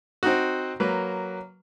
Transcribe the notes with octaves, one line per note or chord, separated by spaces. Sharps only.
C4 D#4 F#4
F#3 A#3 B4